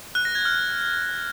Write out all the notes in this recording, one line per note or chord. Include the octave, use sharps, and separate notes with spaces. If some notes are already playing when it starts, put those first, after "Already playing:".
F#6
A#6
G#6
F6